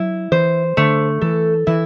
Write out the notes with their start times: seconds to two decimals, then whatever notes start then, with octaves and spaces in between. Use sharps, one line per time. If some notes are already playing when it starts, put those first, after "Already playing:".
Already playing: F#3 E4
0.32 E3 C5
0.77 D3 A3
1.21 E3 A4
1.67 E3 E4